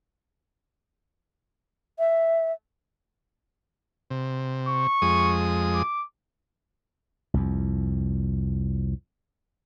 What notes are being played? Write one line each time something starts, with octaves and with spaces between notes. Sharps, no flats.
E5
C3
C#6
F2 G#3 D#6
D6
C2 F2